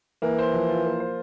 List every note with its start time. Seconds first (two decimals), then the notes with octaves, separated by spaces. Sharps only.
0.22 E3 A#3
0.39 C5
0.54 F3
0.69 F4
0.85 A#3
1.00 C5